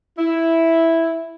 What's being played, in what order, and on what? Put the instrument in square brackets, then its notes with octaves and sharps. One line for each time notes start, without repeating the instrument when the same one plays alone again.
[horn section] E4